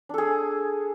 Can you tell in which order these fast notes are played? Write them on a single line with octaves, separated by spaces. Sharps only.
D4 A4 G#4